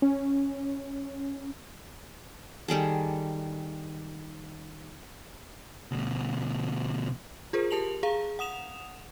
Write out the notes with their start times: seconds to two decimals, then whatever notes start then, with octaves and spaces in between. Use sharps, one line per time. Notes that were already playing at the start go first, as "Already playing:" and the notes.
0.02 C#4
2.68 D#3 G3 G#4 A4
5.91 D2 B2
7.53 F4 G#4 A#4 C5
7.71 G4 A#4 A5 F7 F#7
8.03 G#4 F5 A#5
8.39 F#5 D#6 E7 F7